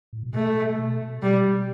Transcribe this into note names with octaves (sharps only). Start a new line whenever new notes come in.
A2
B2
A3
B2
B2 G3